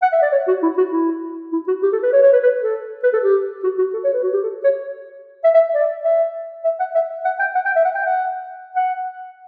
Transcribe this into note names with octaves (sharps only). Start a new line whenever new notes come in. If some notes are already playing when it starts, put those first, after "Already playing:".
F#5
E5
D5
C#5
F#4
E4
F#4
E4
E4
F#4
G4
A4
B4
C#5
C#5
B4
B4
A4
B4
A4
G4
F#4
F#4
A4
C#5
B4
F#4
G4
A4
C#5
E5
E5
D5
E5
E5
F#5
E5
E5
F#5
G5
F#5
G5
E5
F#5
G5
F#5
F#5